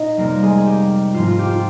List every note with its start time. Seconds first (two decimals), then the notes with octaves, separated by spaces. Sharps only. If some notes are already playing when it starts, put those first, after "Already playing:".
Already playing: A#2 D#4 D#5
0.17 F2 C3 G3 A#3 C4 A#4
0.43 G#3 G#4
0.58 G#4
0.66 G4
1.14 G#2 F3 A#3 F4
1.27 F4
1.39 G4
1.51 F4